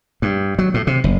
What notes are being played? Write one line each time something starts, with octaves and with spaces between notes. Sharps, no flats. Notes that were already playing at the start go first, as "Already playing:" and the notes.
G2
F#3
A2
C3
F#1